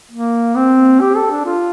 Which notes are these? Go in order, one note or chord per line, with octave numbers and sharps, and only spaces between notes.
A#3
C4
G4
A4
D4
F4